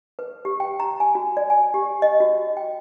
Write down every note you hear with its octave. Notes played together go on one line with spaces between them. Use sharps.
B4
G4
G5
A#5
G#5
F#4
D5
G#5
G4
D#5
F#4
G5